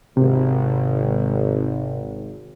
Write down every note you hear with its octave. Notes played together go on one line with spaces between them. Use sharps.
G#1 C3